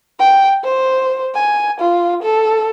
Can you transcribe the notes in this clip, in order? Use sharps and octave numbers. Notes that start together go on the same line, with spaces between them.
G5
C5
G#5
F4
A4